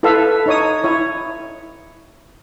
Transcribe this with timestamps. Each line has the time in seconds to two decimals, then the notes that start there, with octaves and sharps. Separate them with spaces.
0.03 E4 A4 B4 E5 F5
0.46 D#4 C#5 D#6
0.84 E4 C#5